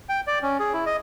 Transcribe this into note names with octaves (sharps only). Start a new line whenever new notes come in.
G5
D5
C#4
G#4
E4
D#5